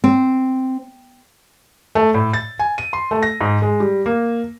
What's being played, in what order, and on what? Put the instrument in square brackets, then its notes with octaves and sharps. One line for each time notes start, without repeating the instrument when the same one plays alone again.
[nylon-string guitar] C4
[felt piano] A3
A2
A6
G#5
D#7
C6
A3
A#6
G#2
G#3
G3
A#3